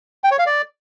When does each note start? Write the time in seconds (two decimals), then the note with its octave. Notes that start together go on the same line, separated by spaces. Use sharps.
0.24 G5
0.31 C#5
0.39 F5
0.46 D5